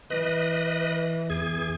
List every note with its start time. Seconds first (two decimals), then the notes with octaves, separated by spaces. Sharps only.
0.10 E3 B4 D#5
1.30 E2 G#4 G#6